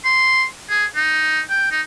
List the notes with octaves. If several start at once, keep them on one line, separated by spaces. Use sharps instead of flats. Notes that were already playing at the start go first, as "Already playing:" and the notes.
C6
G#4
D#4
G5
D#4